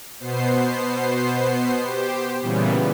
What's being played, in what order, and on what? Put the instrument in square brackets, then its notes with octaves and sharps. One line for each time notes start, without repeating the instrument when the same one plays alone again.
[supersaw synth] B2 B3 C5 C7
G4 C5
A#2 C#3 E3 G3 B3